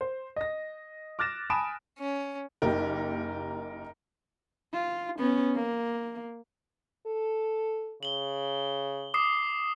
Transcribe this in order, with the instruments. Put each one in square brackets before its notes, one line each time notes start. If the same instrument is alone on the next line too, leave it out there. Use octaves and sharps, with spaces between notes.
[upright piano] C5
D#5 A#6
D6 F6 F#6 A6 A#6 E7
G#5 A5 B5 D#6 D7 E7
[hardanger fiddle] C#4
[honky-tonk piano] F#1 A#3 G4 [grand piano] D#4 A#4
[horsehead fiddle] F4
B3 C#4
A#3
[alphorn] A4
[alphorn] C#3 [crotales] F#7 G7
[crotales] D6 D#6 C7